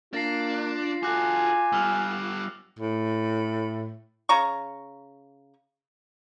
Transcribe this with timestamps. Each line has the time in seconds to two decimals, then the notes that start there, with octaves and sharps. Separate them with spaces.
0.13 A#3 D4 F4 A6 A#6 C7
1.03 F#4 A4 G#5 D6 F#6
1.72 G3 B3 E6 F6 F7
2.79 A2
4.29 C#3 A#5 C#6